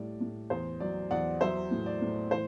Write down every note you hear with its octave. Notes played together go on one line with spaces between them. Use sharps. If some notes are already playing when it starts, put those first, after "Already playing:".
Already playing: A2 G3 D5
A2
E2 C5
F#3 D5
E2 D5 F#5
F#3 C5 E5
A2
D5
A2
E3 C5